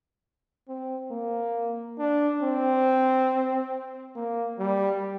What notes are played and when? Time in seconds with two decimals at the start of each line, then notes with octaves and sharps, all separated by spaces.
0.68 C4
1.11 A#3
1.98 D4
2.42 C4
4.16 A#3
4.59 G3